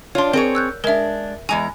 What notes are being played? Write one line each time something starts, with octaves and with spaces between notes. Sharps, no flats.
D4 F4 C#5 D5 C6
C4 G#4 A#4 C#5
E6 F#6 G6
G#3 D4 A#4 E5
E2 G#3 G#5 A#5